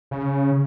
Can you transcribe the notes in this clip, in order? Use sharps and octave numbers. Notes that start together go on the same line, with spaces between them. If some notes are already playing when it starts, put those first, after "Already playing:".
C#3